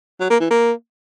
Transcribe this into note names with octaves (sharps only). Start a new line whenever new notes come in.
F#3
A#3
E3
A#3